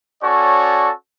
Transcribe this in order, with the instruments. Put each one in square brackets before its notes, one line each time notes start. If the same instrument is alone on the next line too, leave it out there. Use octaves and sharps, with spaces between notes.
[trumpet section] C#4 F#4 A4 C#5 D5